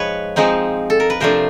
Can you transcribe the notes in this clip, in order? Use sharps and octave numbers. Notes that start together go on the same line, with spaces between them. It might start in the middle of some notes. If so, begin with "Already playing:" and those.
Already playing: F3 G#3 D#4 B4 C#5
F3 G#3 C4 D#4
A4
A#4
B4
C3 F3 A3 D4 A#4 C5